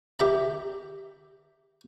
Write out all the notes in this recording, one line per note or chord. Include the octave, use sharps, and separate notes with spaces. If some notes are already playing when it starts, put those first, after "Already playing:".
G4 E5 A#5